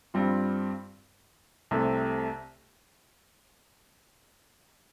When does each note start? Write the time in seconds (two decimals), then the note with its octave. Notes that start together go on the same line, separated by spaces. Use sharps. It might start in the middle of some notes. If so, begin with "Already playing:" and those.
0.14 G2 G3 C4 F4
1.71 C2 C3 A3